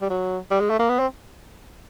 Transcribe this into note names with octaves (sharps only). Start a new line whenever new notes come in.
G3
F#3
G3
G#3
A3
A#3
B3
C4